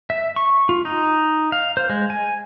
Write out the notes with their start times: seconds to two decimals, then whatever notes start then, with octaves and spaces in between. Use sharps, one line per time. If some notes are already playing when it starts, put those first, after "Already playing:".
0.10 E5
0.36 C#6
0.69 F4
0.85 D#4
1.52 F5
1.77 C5
1.90 G#3
2.10 G#5